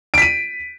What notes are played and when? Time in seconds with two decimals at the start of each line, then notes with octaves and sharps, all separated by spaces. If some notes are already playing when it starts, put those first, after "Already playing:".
0.14 D7
0.18 B6
0.22 D#7